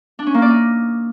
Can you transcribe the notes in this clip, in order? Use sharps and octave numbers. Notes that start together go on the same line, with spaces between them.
D4
C#4
A#3
D5
D#4